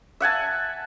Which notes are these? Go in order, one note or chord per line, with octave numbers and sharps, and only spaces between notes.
E5 F#5 G#5 A5